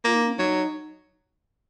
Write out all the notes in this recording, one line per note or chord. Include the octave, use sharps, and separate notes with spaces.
A#3 F4
D#4
C#4
F#3 D#4